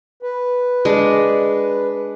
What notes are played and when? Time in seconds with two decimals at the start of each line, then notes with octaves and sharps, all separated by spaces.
0.23 B4
0.85 G#3 D4